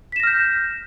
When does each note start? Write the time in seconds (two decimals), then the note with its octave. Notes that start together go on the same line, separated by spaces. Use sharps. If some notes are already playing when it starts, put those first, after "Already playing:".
0.12 B6
0.16 E7
0.20 A#6
0.23 F6
0.27 G6